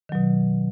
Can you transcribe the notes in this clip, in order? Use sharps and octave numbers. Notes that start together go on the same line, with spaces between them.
B2 D#3 F#3